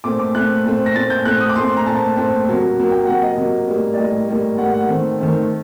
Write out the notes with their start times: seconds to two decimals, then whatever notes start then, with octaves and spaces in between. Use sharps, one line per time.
0.04 A#2 A3 C4 D6
0.19 D6
0.35 A#2 A3 C4 F#6
0.65 A#2 A3 C4
0.86 A#6
0.95 A#2 A3 C4 A6
1.10 G6
1.25 A#2 A3 C4 F#6
1.40 D#6
1.49 D6
1.55 A#2 A3 C4 C6
1.77 A#5
1.86 A#2 A3 C4 A5
2.16 A#2 A3 C4
2.46 C3 F#3 A#3
2.77 C3 F#3 A#3
2.91 G5
3.07 C3 F#3 A#3 F#5
3.22 D#5
3.37 C3 F#3 A#3 D#5
3.68 A2 G3 A#3
3.94 D5
3.97 A2 G3 A#3 D#5
4.28 A2 G3 A#3
4.58 A2 G3 A#3 F#5
4.74 F#5
4.89 D#3 A3 C4
5.19 D#3 A3 C4